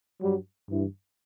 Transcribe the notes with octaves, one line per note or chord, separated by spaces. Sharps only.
G2 F#3 G3
G2 E3